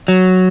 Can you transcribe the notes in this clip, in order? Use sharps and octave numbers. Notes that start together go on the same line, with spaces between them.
F#3